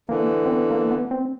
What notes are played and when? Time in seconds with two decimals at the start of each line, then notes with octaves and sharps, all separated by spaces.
0.09 D3 E3 A#3
0.46 C4
0.50 B3
0.71 A#3
0.91 B3
1.11 C4